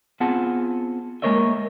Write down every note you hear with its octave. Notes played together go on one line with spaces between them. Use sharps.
B3 C4 F4 G#4 F#5 A5
G#3 A#3 A#4 C#5 D#5 E5